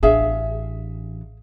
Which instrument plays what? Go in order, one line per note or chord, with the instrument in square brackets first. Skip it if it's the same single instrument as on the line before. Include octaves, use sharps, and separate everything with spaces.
[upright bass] A1 D4 [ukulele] G#4 E5 F5